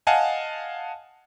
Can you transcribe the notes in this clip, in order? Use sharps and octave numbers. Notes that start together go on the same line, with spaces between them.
D#5 F5 F#5 G#5 A5